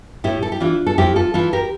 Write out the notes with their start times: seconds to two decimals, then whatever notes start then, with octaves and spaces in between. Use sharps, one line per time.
0.24 A2 E4 G4
0.43 A4
0.52 G4
0.60 E3 D4 F4
0.87 A4
0.98 F2 E4 G4
1.16 F4 A4
1.34 E3 F4 A4
1.53 G4 A#4